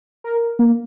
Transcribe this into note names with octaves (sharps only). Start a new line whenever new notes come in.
A#4
A#3